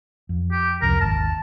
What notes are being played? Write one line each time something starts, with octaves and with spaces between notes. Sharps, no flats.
F2
G4
C2 F2 A#4
G#1 D#2 A5